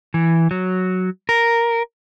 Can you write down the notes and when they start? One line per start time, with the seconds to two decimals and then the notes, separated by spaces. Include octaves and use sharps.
0.14 E3
0.51 F#3
1.29 A#4